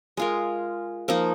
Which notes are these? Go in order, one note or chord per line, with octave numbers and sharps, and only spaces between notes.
G#3 F4 A#4
F3 A#3 D#4